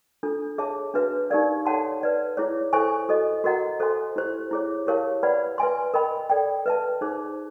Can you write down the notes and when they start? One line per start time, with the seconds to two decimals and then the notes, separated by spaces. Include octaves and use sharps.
0.23 D4 F4 A4
0.58 G#4 C#5 E5 A5
0.94 D4 F#4 B4 E5
1.30 D#4 G4 A#4 D5 F5
1.66 A4 C#5 F#5 A5 C6
2.01 B4 D5 F#5
2.37 E4 G#4 C#5
2.73 A4 C5 E5 G#5 C#6
3.09 F#4 A4 C5 D#5
3.44 F#4 A#4 D#5 F#5 A#5
3.80 A4 C5 E5 G#5 C6
4.16 E4 G4 C5
4.51 E4 G#4 C#5
4.87 G4 A#4 C#5 F5 A5
5.23 B4 D5 F#5 B5
5.58 B4 E5 G#5 C6
5.94 A#4 D#5 G5 B5
6.30 A4 D5 G5
6.66 B4 E5 A5
7.01 D#4 G#4 C5